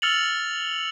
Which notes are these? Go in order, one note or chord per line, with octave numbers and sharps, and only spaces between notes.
E6 F6 A6 C#7 F7 F#7